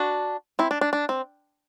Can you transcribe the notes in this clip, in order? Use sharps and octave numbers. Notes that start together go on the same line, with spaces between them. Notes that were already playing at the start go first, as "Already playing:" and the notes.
Already playing: D4 F#4
C4 E4
D4
D4
D4
C4